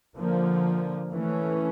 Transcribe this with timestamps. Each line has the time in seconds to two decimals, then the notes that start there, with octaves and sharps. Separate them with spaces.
0.16 D3 F3 A#3
1.14 E3 A3 C#4